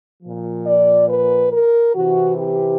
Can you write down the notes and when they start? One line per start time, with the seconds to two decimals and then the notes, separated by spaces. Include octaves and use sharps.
0.23 A#2 F3
0.66 D5
1.09 B4
1.52 A#4
1.95 C3 E3 F#4
2.38 G4